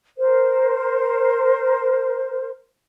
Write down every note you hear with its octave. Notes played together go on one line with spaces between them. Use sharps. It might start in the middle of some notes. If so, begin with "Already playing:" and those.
A#4 C5